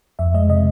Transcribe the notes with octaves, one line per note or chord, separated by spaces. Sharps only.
F2 E5
G#3 D#5
C3 D#5